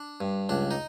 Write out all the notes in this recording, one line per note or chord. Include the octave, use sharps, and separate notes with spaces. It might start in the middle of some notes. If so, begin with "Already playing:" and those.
Already playing: D4
G2
C#2 D4
D#4